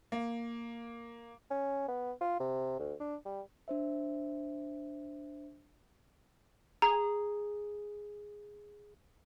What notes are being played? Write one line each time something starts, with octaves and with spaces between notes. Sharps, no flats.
A#3
C#4
B3
F4
C3
D2
D4
G3
D4 C5 E5
G#4 A#5